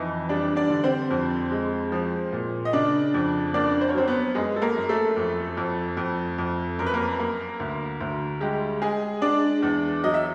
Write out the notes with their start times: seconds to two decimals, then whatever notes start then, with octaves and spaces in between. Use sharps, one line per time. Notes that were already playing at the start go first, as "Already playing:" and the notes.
Already playing: F2 E3 D#4 D#5
0.29 G3 D4 D5
0.56 D4 D5
0.70 D3
0.84 C4 C5
1.11 F2
1.51 G#3
1.92 F3
2.32 A#2
2.65 D#5
2.73 C#3 D4 D5
3.14 F2
3.54 A#3 D4 D5
3.81 C5
3.89 C#5
3.94 F#3 C4 C5
4.08 B3 B4
4.35 F#2 G#3 G#4
4.56 A4
4.62 A#3 A#4
4.76 F#2
4.89 A3 A4
5.16 F2
5.57 F2
5.97 F2
6.38 F2
6.79 F#2 A#4
6.86 B4
6.94 A#3 A#4
7.19 A#3
7.60 D2
8.01 D2
8.41 G3 G#3 G4
8.82 G#3 G#4
9.22 G#3 D4 D5
9.63 E2
10.04 F#3 D#5
10.14 E5